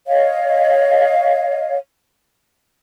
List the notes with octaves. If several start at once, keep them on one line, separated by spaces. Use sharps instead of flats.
C#5 D#5 F5